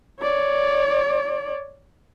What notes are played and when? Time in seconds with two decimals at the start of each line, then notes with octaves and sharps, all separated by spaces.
0.21 C#5 D5